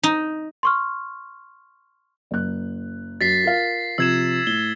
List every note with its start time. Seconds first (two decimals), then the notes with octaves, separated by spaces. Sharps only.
0.03 D#4
0.63 C6 C#6 F6
2.31 F#1 F#6
3.21 F#2 A6 B6 C7
3.43 F4 A#4 F5
3.98 C3 F3 E6 G#6 E7
4.47 A2 G7